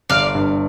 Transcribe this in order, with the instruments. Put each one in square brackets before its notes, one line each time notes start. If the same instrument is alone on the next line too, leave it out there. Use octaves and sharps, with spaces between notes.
[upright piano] G1 [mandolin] D5 F5
[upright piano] G2